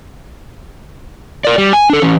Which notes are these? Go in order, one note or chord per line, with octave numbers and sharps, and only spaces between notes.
A#4 D5
G3
G#5
D4 A4
E3 C#4